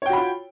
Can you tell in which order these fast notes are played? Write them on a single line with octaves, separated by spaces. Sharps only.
C#5 G5 F#4 B5 F4